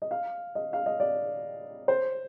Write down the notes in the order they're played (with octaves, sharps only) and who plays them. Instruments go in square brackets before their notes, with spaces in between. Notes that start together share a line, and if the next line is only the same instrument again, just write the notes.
[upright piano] D#5
F5
D#5
F5
D#5
D5
C5